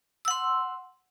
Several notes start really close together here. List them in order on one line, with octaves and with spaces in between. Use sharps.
E6 F#5 C6